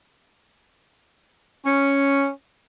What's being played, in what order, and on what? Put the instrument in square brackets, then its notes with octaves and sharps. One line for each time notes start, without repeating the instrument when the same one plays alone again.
[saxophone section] C#4